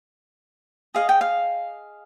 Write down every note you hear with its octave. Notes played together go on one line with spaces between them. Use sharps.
G#4 D#5 F5
G5
F5